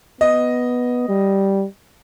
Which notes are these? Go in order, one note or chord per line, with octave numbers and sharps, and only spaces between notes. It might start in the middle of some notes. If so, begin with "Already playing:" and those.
B3 D#5
G3